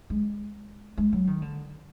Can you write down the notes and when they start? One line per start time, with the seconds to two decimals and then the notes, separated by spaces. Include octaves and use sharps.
0.10 G#3
0.98 G#3
1.13 F#3
1.27 D#3
1.42 D3